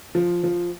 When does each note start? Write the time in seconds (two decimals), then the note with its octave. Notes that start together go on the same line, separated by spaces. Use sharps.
0.15 F3
0.44 F3